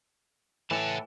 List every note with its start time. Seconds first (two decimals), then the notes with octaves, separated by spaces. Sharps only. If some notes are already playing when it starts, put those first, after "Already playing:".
0.71 A2 E3 F#5 A5